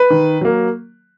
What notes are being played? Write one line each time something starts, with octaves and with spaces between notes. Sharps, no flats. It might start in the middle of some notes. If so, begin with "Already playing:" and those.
Already playing: B4
D#3
F#3 A#3